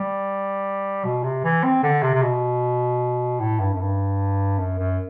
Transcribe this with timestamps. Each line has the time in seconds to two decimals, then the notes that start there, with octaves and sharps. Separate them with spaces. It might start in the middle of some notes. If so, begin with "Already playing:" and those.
Already playing: G3
1.05 B2
1.23 C3
1.44 E3
1.63 C4
1.83 D3
2.03 C3
2.14 C3
2.22 B2
3.40 A2
3.60 G2
3.73 F#2
3.80 G2
4.59 F#2
4.78 F#2